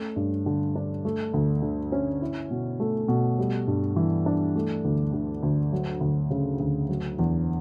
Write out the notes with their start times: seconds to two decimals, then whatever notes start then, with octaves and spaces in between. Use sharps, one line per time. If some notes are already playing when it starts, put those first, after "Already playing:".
Already playing: A3 C#4
0.16 G2
0.46 D3
0.75 D4
1.05 A3
1.34 D2
1.62 D3
1.92 C#4
2.22 E4
2.51 B2
2.80 A3
3.08 B2
3.39 G3
3.67 G2
3.96 E3
4.26 D4
4.55 A3
4.85 D2
5.13 D3
5.43 D2
5.72 F#3
6.01 D2
6.30 C#3
6.60 D2
6.89 F#3
7.19 E2